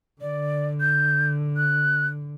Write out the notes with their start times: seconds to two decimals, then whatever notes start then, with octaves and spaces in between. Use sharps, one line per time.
0.21 D3 D5
0.81 G6
1.57 F#6